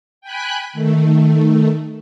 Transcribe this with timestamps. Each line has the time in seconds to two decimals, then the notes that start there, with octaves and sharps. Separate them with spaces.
0.21 G5 G#5 B5 F#6
0.73 D#3 A3